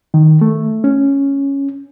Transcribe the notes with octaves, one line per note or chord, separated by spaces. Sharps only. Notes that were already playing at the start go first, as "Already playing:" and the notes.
D#3
A3
C#4